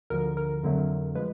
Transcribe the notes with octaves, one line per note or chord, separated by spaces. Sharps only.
D2 D3 F3 A#4
A#4
F2 D3 F#3 A3
F3 G#3 B4